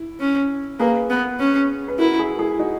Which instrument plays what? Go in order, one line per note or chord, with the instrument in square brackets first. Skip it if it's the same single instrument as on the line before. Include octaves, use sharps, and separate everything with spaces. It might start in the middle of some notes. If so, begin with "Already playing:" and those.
Already playing: [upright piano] E4
[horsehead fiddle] C#4
[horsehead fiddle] A#3 [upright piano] G#4 B4
[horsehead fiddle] B3
C#4
[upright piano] B4
[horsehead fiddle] E4 [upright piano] F#4 A#4
[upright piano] E4 G#4
E4 G#4
D#4 F#4